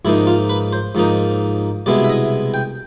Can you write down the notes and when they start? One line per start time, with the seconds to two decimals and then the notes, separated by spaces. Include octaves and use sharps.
0.05 G#2 F3 A#3 D#4 E4
0.27 F4
0.49 B4
0.73 C5
0.95 G#2 F3 A#3 D#4
1.86 C2 B2 G#3 B3 E4 D5
2.04 E5
2.10 D#5
2.54 G5